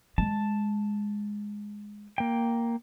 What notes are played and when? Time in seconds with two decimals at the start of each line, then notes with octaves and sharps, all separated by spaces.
0.18 G#3 A5
2.18 A#3 G5